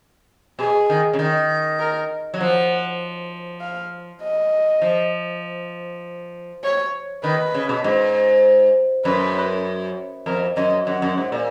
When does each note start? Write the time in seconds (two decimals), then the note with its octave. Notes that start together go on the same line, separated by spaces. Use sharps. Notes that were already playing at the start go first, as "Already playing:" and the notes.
0.59 B2 G#4
0.90 D#3
1.13 C#3
1.19 D#3
1.79 A#4
2.34 F#3
2.40 F3 F#5
3.61 F5
4.22 D#5
4.82 F3
6.64 C#5
7.24 D#3 B4
7.54 C#3
7.69 B2
7.84 G#2
9.05 F#2 B4
10.26 F2 A#4
10.57 F#2 D#5
10.87 F#2 F#5
11.02 F#2
11.18 G#2
11.32 A#2